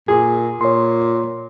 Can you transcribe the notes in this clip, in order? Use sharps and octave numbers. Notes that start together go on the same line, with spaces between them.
A#2 G#4
A#2 C#5 C6